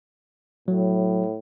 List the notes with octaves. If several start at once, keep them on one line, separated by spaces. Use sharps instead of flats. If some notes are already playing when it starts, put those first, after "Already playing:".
A2 F#3